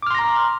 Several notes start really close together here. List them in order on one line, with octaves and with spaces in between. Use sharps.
D6 F6 C6 A#6 A#5